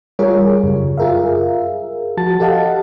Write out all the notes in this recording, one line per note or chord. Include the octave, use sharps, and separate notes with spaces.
G3 F4 G#4 A#4 C#5
F#2 C#3
F4 G#4 A#4 E5 F5
F3 F#4 A5 A6
G4 A4 D#5 F5 F#5 A5